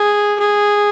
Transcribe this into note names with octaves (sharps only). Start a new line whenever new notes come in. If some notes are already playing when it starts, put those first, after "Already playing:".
Already playing: G#4
G#4